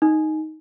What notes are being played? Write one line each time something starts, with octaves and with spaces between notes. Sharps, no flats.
D#4